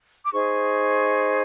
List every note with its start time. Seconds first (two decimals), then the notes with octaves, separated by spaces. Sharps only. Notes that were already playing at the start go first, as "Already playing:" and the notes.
0.25 D6
0.32 D#4 G#4 C5 C#6